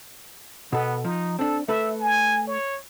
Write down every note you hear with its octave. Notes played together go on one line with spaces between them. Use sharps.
B2 B3 A4
F3 D#4
C4 D4 A4
A3 A4 B4 E5
G#5
C#5